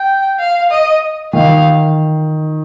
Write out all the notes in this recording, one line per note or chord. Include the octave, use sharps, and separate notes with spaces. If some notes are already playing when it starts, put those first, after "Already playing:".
Already playing: G5
F5
D#5
D#3 F5